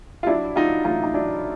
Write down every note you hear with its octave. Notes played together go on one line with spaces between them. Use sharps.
F4
F#3 D4 E4
F#3 D#4 F4
A1 D#4 F4
D#4
F#3 D4 E4